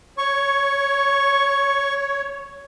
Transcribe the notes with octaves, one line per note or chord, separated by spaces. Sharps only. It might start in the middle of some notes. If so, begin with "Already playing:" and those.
C#5 C#6